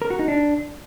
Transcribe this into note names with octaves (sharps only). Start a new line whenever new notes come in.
A#4
F#4
D#4
D4